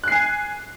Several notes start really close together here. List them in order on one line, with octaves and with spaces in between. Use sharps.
F#6 C7 G#5